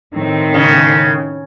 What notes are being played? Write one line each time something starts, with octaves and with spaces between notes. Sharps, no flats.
A2 D#3 C4
C#3